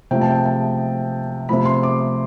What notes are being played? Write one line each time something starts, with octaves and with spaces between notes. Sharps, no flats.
C3 F3 A3 G5
A5
G5
A5
C3 F3 A3 B5
C6
D6